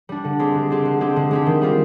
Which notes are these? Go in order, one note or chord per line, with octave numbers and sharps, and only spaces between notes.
G3 D4
D3
G#3 C4 G4
D3
G#3 C4 G4
D3
G#3 C4 G4
D3
G#3 C4 G4
D#3
G3 C4 F4